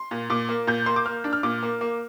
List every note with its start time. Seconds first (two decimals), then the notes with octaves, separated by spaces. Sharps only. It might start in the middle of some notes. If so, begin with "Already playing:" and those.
Already playing: C6
0.11 A#2
0.30 A#2 D6
0.49 A#3
0.67 A#2 G6
0.86 A#3 C6
0.96 D6
1.06 A#3 F6
1.24 D4
1.33 F6
1.43 A#2 D6
1.63 A#3
1.81 A#3